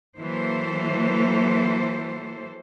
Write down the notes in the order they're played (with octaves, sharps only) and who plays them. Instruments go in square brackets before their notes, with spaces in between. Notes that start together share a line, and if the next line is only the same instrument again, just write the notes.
[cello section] E3 F#3 A#3 A4 C5